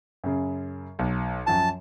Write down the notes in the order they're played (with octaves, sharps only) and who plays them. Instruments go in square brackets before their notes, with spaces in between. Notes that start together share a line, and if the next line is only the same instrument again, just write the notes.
[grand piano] F#2 C#3
B1
[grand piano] F#2 F3 F#3 [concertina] A5